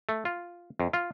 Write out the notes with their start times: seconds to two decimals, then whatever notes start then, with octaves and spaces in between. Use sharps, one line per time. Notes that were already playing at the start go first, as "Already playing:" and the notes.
0.09 A3
0.25 F4
0.80 F2
0.93 F4